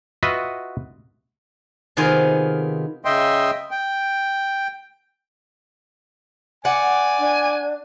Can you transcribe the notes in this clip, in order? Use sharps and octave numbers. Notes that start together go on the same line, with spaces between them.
F4 F#4 B4 D#5 E5 F#5
C3 D#3 B3 F4 G#4
C#3 D#5 E5 G5 C6
G5
D5 F#5 G#5
D4